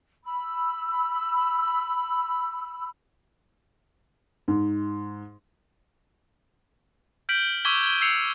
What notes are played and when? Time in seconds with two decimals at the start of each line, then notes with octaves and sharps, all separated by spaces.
0.24 B5 E6
4.48 G#2
7.29 F6 G6 B6 D7 F#7
7.65 C#6 D6 E6 G#6 B6 G7
7.83 G#6 G7
8.01 E6 G#6 C7 C#7 F7